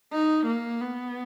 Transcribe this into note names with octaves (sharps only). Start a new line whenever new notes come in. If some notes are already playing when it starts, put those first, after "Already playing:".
D#4
A#3
B3